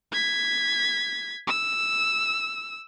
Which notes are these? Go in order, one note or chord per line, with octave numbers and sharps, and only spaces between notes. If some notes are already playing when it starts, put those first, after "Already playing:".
G#6 B6
E6